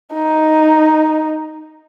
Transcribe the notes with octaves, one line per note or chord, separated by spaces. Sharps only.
D#4